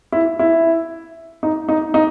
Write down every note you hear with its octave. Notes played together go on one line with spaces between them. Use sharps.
E4
E4
D#4
D#4
D#4